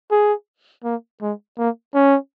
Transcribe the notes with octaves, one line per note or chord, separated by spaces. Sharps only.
G#4
A#3
G#3
A#3
C#4